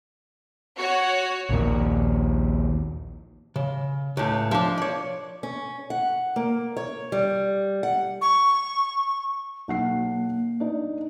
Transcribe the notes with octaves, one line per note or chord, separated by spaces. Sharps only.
F#4 C#5
A#1 D#2 A#2
C#3
C#2 A2
F3 D4
C#5 D5
C#4
F#5
A#3
C#5
G3
F#5
C#6
B1 A#3 F#5 C7
D4 D#4